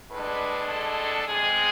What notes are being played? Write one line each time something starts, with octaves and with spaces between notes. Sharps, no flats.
A2 G#3 D4 B4
A4
C3 G#3 C4 G#4